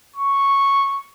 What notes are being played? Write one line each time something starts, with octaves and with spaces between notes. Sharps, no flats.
C#6